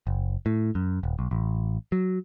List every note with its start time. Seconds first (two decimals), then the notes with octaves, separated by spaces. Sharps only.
0.07 F#1
0.46 A2
0.75 F#2
1.03 D#1
1.19 B1
1.31 A1
1.92 F#3